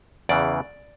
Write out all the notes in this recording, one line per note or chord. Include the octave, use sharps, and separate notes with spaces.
E2 C#3 E3 D5